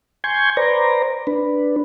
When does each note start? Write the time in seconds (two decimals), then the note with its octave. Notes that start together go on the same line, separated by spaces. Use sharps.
0.24 G#5 C6 C#6 G6 G#6
0.57 B4 C5 D5 A#5
1.27 D4 B4